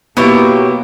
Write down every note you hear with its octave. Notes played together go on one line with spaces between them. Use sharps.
B2 F#3 A#3 B3 E4 G4